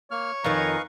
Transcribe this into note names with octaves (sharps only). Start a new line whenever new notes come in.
A#3 C#5 F6
F2 D#3 B4 D#5 F5 G#5 A#5 C#6